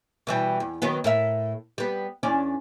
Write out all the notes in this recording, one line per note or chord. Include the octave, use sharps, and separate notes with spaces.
B2 E3 G3
E2
D#3 F#3 B3
A2 A#4 E5
G3 B3
E2 C#4 D4